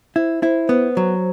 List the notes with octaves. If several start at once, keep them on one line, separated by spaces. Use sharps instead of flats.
E4 C5
E4 C5
B3 C5
F#3